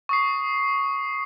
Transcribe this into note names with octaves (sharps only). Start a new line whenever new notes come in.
C#6 D#6 C7